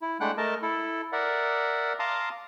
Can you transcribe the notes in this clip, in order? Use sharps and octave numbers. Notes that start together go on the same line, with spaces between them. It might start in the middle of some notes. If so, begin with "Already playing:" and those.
E4
G#3 A3 D4 F#5 G5 F#6
A3 A#4 D#5 A5
E4 A4
A#4 D5 E5 F#5
F5 A5 A#5 C6 D6 D#6